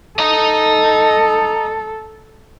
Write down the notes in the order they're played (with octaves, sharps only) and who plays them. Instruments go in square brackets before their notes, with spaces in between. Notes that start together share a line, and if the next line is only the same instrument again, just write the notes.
[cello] A4 [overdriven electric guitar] D#5 A#5